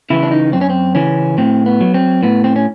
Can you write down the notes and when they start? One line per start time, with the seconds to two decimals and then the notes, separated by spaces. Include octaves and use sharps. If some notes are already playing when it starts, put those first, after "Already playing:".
0.10 C#3 E3 E4
0.23 D4
0.32 D#4
0.52 F#2 C4
0.61 C#4
0.70 C4
0.95 C#3 E3 C#4
1.38 A2 C4
1.66 B3
1.81 F#3
1.94 C4
2.23 A2 B3
2.44 C4
2.56 C#4